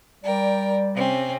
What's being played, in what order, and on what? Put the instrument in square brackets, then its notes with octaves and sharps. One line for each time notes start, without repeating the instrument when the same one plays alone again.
[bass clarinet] G3 [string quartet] A#4 G5 [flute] D5
[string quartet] C3 C4 C#4